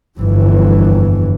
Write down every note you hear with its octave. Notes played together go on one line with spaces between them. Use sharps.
G1 F2 E3